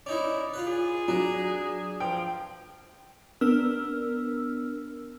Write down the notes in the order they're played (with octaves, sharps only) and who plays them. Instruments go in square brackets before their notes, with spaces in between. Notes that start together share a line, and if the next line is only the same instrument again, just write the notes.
[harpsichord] C#4 D#4 E4 [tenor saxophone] D5
[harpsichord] F4 B4
[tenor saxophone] G#4
[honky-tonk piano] F#3 [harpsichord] D4
[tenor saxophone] F3 [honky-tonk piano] G5
[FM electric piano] B3 D4 A#4 E6 F6